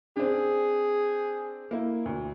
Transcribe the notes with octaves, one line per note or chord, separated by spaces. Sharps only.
C4 D4 G#4
A#3 E4
D2